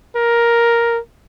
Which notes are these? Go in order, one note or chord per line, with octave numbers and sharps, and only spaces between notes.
A#4